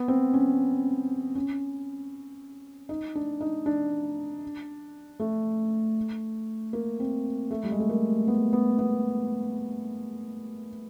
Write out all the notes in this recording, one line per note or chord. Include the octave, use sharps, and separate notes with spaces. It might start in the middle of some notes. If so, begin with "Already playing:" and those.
Already playing: B3
C4
C#4
C#4
D#4
D4
D#4
D4
A3
A#3
C4
A3
G3
G#3
A3
A#3
B3
B3
B3